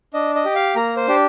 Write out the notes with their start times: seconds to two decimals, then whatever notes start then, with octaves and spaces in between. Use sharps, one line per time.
0.14 D4 D#5
0.35 D#5
0.45 G4
0.56 F5
0.76 A#3 A#5
0.97 C5
1.08 D4 G4